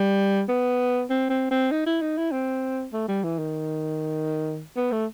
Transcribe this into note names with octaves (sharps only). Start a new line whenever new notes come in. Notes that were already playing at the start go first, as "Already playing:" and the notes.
Already playing: G3
B3
C4
C4
C4
D#4
E4
D#4
E4
C4
A3
G3
E3
D#3
B3
A3